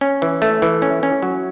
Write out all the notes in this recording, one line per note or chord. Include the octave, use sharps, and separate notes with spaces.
C#4
E3
A3
E3
C#4
C#4
F#3